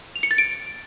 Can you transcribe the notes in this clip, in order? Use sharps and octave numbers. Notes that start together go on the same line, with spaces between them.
F7
C#7
A6
D7